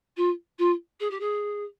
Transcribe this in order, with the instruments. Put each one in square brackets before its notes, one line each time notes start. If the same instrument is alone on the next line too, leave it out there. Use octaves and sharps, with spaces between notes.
[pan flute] F4
F4
G#4
G4
G#4